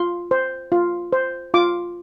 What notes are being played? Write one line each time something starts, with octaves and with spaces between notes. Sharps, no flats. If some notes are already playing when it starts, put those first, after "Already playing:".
Already playing: F4 C6
C5
F4
C5
F4 D6